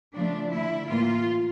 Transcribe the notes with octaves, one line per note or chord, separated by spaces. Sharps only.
C#3 F3 A3 D4
D3 A3 E4
A2 E3 A#3 F4